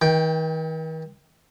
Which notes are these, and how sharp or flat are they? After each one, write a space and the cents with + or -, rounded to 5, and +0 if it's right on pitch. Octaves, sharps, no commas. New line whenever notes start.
D#3 +45 G5 +0